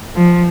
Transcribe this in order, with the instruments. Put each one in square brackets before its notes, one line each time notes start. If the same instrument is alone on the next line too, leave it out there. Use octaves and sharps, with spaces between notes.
[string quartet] F3